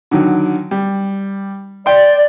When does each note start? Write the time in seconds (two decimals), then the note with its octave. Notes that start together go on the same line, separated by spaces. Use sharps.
0.11 D3 D#3 F#3
0.71 G3
1.86 D5 G5 C6